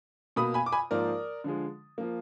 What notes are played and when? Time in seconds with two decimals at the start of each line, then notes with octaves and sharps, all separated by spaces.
0.36 B2 A#3 B5 D#6
0.54 G#5 B5
0.66 D6
0.72 G#5 B5
0.91 G#2 F3 A#3 A#4 D5
1.44 D3 F3 G#3
1.98 F3 A#3